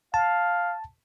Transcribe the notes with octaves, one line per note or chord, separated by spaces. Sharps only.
F5 A5